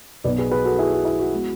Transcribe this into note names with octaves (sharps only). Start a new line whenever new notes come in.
B1 B2 F#3 B3 B4 D5
G#4 B4
G#4 B4
F#4 A4
E4 G#4
F#4
E4
F#4
G#3 B3